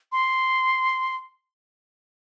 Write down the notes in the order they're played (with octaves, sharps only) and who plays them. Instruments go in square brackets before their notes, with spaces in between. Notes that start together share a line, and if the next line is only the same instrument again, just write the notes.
[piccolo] C6